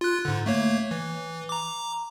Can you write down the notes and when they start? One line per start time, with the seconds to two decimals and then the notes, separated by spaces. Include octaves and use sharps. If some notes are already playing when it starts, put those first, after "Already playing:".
0.01 F4 F#6
0.25 G#2 D3
0.46 A3 A#3 C#5
0.91 E3
1.49 A#5 D6